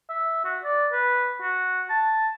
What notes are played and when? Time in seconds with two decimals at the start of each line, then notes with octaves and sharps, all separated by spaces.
0.09 E5
0.45 F#4
0.64 D5
0.92 B4
1.42 F#4
1.90 A5